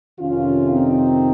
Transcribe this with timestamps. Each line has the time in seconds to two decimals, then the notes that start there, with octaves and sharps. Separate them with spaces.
0.19 F2 C3 D#3 C#4 F4
0.70 C4 D#4